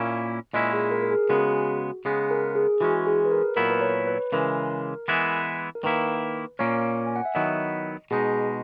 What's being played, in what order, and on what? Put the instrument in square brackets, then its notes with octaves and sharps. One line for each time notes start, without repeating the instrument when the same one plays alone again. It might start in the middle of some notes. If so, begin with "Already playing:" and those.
Already playing: [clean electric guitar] A#2 A#3 C#4 E4
[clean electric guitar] A#2 G#3 C#4 E4 [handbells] D#5
[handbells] G#4
A#4
A#4
G#4
[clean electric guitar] C#3 G#3 B3 [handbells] F#4
[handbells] G#4
F#4
[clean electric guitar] C#3 G#3 B3 [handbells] G#4
[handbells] A#4
G#4
[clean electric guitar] E3 G#3 C#4 [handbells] F#4
[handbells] G#4
B4
A#4
[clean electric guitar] A#2 F#3 B3 E4 [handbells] A#4
[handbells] B4
C#5
B4
[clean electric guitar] C#3 E3 G#3 [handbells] A#4
[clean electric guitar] E3 G#3 B3 E4
[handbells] A#4
[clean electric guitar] D#3 A#3 E4 [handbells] B4
[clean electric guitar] A#2 A#3 C#4 [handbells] C#5
[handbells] G#5
F#5
E5
[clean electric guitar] D#3 F#3 B3 E4 [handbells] D#5
[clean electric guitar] B2 G#3 D#4 [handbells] G#4